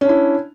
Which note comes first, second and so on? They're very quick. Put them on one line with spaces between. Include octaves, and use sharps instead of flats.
C#4 D4 E4